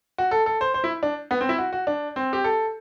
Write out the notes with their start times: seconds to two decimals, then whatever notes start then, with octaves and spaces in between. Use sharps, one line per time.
0.18 F#4
0.31 A4
0.46 A4
0.61 C5
0.74 C5
0.84 E4
1.03 D4
1.31 B3
1.41 C4
1.49 E4
1.58 F#4
1.73 F#4
1.87 D4
2.16 C4
2.33 G4
2.44 A4